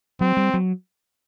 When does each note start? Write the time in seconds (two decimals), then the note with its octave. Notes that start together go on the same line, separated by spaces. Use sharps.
0.21 F#3 C4
0.37 G3
0.54 F#3